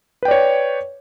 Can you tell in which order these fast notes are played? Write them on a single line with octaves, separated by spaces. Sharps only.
B4 G5 D5 C#5